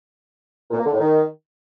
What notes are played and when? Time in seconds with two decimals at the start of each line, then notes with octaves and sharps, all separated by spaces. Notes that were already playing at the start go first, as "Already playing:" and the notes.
0.71 A#2
0.78 A#3
0.86 D3
0.93 A2
1.00 D#3